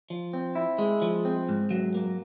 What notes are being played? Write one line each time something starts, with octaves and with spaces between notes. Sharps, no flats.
F3
C4
E4
G#3
F3
C4
G#2
F#3
A#3